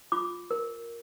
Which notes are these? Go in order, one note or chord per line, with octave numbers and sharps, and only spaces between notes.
F4 D6
A#4